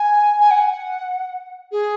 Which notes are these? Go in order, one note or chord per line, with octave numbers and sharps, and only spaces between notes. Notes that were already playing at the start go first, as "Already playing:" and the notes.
Already playing: G#5
G#5
F#5
G#4